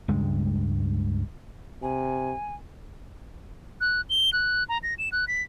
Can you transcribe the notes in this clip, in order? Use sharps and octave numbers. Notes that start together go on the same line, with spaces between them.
C#2 G2 G#3
C3 G#5
F#6
G7
F#6
A#5
A#6
E7
F#6
B6